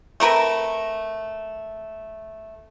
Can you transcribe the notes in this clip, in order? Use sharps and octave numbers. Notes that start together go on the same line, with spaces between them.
A3 C4 A#4 B4